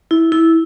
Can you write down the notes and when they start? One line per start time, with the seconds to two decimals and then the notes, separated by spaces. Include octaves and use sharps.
0.11 E4
0.32 E4